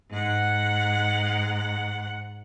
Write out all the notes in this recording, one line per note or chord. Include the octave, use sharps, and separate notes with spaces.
G#2 F#5